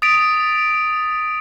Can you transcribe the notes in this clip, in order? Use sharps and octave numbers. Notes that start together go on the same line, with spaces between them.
D#6 A6 B6 D7 F7